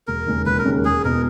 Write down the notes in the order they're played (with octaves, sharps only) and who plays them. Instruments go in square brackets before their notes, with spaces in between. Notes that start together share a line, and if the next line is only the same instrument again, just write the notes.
[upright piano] E1 [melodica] A#4
[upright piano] D#2 C#3 G#3 C#4
[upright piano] E1 [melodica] B4
[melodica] A#4
[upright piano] D#2 C#3 G#3 C#4
[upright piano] E1 [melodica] G#4
[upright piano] E2 B2 [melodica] A#4